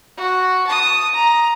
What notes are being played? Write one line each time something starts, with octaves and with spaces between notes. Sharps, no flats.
F#4
A5 D#6
A#5